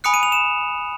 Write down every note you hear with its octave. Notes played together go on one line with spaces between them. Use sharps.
G#5 B5 D#6 F#6 C#7
D#7
F7
E7